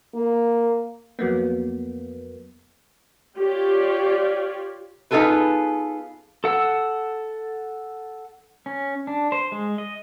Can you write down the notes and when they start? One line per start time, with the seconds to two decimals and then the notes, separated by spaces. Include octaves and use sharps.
0.15 A#3
1.19 F2 F#3 A#3 B3
3.36 F4 G4 C#5 D5
5.11 B3 D#4 F4 G#4 A4 B4
6.44 A4 F#5 E6
8.66 C#4
9.07 D4
9.32 C5
9.52 G#3
9.78 D#5